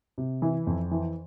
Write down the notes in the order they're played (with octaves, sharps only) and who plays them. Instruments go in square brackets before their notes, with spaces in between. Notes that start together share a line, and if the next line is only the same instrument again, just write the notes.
[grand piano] C3
E3
F2
E3